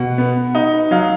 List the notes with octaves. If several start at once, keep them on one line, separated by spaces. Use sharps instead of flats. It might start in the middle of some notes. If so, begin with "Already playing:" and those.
Already playing: B2 F#5
B3
D#4
F#3 F5